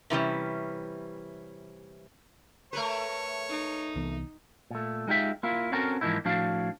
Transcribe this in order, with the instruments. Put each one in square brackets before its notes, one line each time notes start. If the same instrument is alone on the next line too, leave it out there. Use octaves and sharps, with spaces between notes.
[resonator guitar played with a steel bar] C3 E3 G3 C#4
[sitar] A3 A#4 B4 [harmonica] C#5
[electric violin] D#4
[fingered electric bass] C2 E3 B3
[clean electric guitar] A#2 A3
G#3 D#4 F4 G4 E5
A#3 E4 F4
C4 C#4 F#4 A4 A#4
G#2 E3 F3 A#3 D#4 E4
A2 F3 D4 F#4 F5